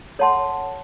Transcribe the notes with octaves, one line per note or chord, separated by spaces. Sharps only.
A4 C#5 F#5 A5 C6